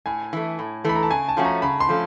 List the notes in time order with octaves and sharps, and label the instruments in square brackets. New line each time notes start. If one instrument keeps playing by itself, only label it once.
[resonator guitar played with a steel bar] A2 [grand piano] G#5
[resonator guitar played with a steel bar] E3 A3
A2
[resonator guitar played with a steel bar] E3 A3 [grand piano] B5
[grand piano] A#5
A5
[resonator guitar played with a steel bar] C#3 [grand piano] G#5
[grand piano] A5
[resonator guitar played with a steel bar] F3 A3 C#4 F#4
[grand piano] A#5
[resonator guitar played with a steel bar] C#3 [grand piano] B5
[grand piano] C6
[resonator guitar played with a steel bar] F3 A3 C#4